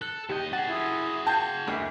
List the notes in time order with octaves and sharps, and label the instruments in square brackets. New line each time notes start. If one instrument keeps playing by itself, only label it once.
[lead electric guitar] A4 [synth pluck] F#6
[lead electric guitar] D#2 D#5 [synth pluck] G4 G5
[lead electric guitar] F#4 G#4 [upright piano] F#5 [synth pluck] A6
[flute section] E4 F4 D#6
[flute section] F4 F5 [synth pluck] G5 G6 G#6 [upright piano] A5
[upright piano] F#1 D2 [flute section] G4 E5 F#5